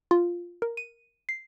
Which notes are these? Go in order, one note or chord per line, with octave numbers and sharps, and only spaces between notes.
F4
A#4
D#7
C7